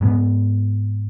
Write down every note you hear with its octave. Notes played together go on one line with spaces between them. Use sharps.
G#2 G#3 B3